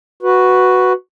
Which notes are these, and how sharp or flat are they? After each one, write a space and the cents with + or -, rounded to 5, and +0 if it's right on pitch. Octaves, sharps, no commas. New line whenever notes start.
F#4 +0 B4 +0